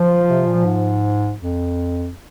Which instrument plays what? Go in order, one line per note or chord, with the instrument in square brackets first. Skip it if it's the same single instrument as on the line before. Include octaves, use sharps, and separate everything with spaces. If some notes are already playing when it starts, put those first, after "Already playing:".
Already playing: [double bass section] F3
[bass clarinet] C3
A#2
G#2
F2